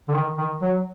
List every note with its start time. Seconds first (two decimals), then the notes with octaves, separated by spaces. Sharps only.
0.08 D3
0.14 D#3
0.38 D#3
0.62 F#3